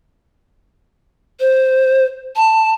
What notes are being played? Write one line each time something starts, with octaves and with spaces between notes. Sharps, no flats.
C5
A5